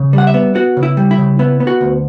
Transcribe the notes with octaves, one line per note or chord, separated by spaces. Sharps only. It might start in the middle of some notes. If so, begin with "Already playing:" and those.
Already playing: C#3
G3
F#5
E5
B3
B3 F#4
C#3
E4
G3
E4
C#3
B3 E4
B3
F#4
D2